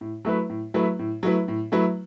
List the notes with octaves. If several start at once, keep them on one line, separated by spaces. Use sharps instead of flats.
A2
F#3 A3 E4 B4
A2
F#3 A3 E4 B4
A2
F#3 A3 E4 B4
A2
F#3 A3 E4 B4